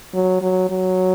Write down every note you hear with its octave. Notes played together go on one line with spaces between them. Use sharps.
F#3
F#3
F#3